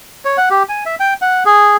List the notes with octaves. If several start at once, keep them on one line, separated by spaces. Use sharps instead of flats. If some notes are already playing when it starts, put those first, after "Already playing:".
C#5
F#5
G4
G#5
E5
G5
F#5
G#4